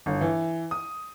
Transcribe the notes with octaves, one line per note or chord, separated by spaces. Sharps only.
G1
E3
D#6